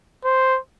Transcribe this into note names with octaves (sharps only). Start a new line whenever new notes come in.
C5